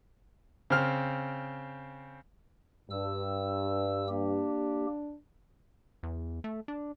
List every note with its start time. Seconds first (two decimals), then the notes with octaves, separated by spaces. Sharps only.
0.70 C#3 C4 G5 F6
2.90 G2 E6
4.09 A#3 D4 G4
6.03 E2
6.44 A3
6.68 D4